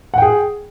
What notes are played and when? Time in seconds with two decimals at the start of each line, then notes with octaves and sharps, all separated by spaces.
0.14 F#5
0.18 G5
0.22 G#4